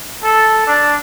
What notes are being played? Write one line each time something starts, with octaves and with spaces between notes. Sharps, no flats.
A4
D4